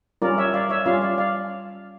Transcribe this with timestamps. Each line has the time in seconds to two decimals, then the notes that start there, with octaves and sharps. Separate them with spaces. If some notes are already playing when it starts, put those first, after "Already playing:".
0.22 G3 C#4 F4 A#4 D5
0.38 C#5 E5
0.54 D5 F5
0.69 C#5 E5
0.86 G3 C#4 F4 D5 F5
1.01 D5 F5
1.18 D5 F5